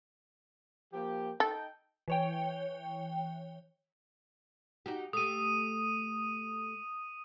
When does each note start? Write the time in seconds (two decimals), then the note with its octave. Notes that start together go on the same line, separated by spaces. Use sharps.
0.93 F3 A#3 G4
1.40 D#4 A4 G5
2.08 E3 C#5 G5
4.86 D#4 F#4 G4
5.13 A3 G4 D#6 D#7